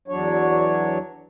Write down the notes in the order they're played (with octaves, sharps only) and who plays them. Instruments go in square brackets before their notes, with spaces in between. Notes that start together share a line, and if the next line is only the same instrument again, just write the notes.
[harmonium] E2 F#3 D4 C#5